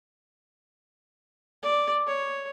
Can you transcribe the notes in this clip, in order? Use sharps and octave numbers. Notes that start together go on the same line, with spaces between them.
D5
C#5